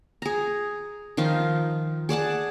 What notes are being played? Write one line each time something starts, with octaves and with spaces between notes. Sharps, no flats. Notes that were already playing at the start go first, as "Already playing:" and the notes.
G#4 A#5
D#3 F3 D#4 F4
G#4 D5 F#5 A5